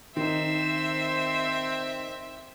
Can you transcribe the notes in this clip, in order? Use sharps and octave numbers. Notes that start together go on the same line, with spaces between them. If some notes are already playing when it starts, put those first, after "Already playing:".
D#3 C4 D#4 C5 E5